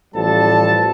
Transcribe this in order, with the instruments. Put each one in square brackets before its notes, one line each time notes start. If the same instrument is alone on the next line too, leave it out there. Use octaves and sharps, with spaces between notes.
[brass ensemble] A1 F3 G3 A4 A5